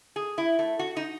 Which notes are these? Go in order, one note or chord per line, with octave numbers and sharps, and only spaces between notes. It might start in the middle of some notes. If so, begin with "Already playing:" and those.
G#4
E4
A3
F#4
D#4